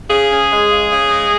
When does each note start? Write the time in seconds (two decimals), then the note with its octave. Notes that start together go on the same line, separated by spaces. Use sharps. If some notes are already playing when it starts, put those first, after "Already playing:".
0.09 C#3 G#4
0.30 C#4
0.51 G#3
0.70 C#3
0.91 C#3
1.11 G#3